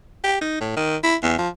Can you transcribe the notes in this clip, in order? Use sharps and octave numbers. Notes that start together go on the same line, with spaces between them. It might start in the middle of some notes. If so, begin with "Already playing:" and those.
G4
D#4
A2
D#3
E4
E2
F3